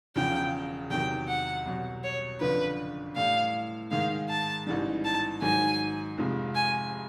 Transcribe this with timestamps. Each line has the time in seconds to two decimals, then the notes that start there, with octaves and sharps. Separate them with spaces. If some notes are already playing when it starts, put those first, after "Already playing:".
0.16 E1 E2 C#3 F3 G5
0.90 E2 C3 D#3 F#3 G5
1.28 F#5
1.66 C2 B2 F#3
2.04 C#5
2.40 F#1 F2 D3 F3 B4
3.16 A2 E3 G3 F5
3.91 G#2 D#3 G#3 F5
4.30 A5
4.67 A1 G#2 E3 G3
5.05 A5
5.42 G#2 D#3 F#3 G#5
6.17 F1 F2 C3 F3 G#3
6.55 G#5